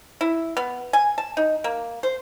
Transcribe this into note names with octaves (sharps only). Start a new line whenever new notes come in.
E4
B3
G#5
A5
D#4
A#3
C5